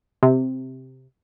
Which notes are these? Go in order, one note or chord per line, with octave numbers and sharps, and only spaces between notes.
C3